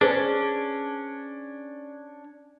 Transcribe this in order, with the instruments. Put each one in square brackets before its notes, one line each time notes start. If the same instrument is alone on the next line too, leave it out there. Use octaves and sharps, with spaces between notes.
[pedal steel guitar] C#4 D4 [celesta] G#4 B4 C5